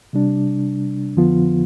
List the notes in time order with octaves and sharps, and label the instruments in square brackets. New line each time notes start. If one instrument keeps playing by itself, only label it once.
[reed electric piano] C3 G3 D4
F2 D3 F3 B3 F4